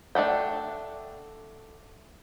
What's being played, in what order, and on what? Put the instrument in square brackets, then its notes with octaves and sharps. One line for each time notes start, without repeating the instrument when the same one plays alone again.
[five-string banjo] A3 D4 F#5 G5